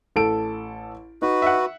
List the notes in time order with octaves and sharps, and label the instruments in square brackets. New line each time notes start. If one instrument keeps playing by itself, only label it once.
[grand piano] A1 A4 D7
[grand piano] D#4 [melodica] F#4 B4
[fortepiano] E5 F#5